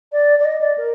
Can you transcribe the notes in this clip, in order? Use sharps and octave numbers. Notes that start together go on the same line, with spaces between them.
D5
D5
D#5
D5
A#4